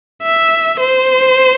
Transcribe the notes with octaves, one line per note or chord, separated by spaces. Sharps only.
E5
C5